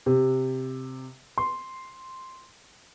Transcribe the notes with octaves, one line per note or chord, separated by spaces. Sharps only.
C3
C6